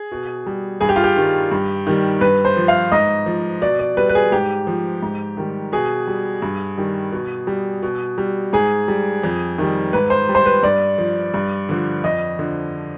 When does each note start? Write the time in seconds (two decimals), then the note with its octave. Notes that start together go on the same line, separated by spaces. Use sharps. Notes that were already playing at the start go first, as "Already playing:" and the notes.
Already playing: G#4
0.12 B2
0.46 G3
0.81 G2 G#4
0.89 G4
0.96 F4
1.04 G4
1.16 D#3 G3
1.51 G2
1.87 D#3 G3
2.21 G2 B4
2.45 C5
2.56 F3
2.68 F5
2.92 G#2 D#5
3.26 F3
3.62 B2 D5
3.80 D5
3.97 G3 B4
4.09 B4
4.15 G#4
4.32 G#2 G4
4.67 F3
5.02 G#2
5.37 D#3 G3
5.72 B2 G#4
6.07 G3
6.42 G2
6.77 D#3 G3
7.12 B2
7.47 G3
7.83 B2
8.18 G3
8.53 G#2 G#4
8.88 G3
9.24 F2
9.58 D#3 G3
9.93 G#2 B4
10.10 C5
10.29 G3
10.35 C5
10.46 B4
10.63 G2 D5
10.98 F3
11.34 G2
11.69 D3 F3
12.04 F2 D#5
12.39 D3 F3